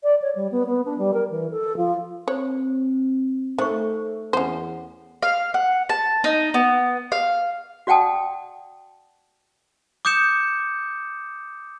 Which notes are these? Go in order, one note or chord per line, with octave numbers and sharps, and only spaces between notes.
D5
C#5
G3
B3
B3
D4
G3
A#4
E3
A4
F3
C4 C5 C#5
D#3 A3 C5 C#6
E2 C#4 C5 F#5
F5
F#5
A5
D#4
B3
F5
F#4 D5 F#5 G5 A5 D#6
D6 D#6 G6 C#7 E7